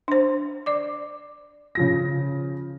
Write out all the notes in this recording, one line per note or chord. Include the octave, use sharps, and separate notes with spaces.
D4 C5
D5 D6
C#3 F3 A#6